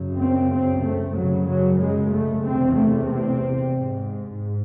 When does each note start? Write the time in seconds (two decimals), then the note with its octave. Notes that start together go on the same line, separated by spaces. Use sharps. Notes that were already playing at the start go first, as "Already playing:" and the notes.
Already playing: F#2 C#3
0.17 C4
0.50 C4
0.83 A3
1.15 F#2 C#3 F#3
1.49 F#3
1.81 G#3
2.13 A3
2.45 E2 C3 C4
2.78 A3
3.11 C4
3.76 G#2